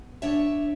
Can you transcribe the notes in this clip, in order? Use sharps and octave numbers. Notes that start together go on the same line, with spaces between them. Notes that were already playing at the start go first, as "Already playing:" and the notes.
Already playing: B3
D4 C#5 E5